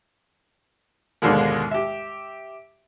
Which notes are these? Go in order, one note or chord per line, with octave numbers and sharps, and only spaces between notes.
D#2 G#2 B2 D3 G#3 A#3
G4 E5